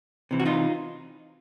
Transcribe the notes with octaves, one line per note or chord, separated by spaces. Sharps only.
C3 E3
F#4
D#4 F4